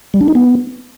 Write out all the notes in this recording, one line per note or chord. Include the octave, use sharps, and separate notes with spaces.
G3
D4
D#4
B3